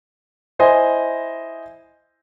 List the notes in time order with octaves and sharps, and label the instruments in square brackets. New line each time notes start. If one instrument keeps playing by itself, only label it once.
[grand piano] E4 C5 D#5 G#5